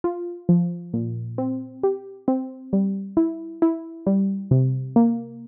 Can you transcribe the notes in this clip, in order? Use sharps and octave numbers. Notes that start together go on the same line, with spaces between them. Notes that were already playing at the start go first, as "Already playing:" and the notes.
F4
F3
A#2
C4
G4
C4
G3
E4
E4
G3
C3
A#3